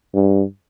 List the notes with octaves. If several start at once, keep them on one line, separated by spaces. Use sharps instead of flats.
G2